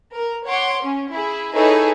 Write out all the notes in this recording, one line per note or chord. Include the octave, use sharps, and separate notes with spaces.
A#4
C#5 F#5 C6 D6
C#4
E4 G#4
D#4 E4 G#4 A4 B4 C#5